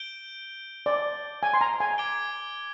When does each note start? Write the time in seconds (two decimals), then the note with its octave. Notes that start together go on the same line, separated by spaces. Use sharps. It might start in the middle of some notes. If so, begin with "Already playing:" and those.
Already playing: G6 D7 G7
0.86 D5
1.43 G#5
1.53 C6
1.61 A#5
1.80 G#5
1.98 D6 G#6 D7 G7